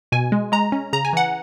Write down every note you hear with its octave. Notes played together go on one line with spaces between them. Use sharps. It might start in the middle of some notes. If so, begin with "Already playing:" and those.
B2 G#5
G#3
G#3 A#5
C#4
C#3 A#5
G#5
E3 F#5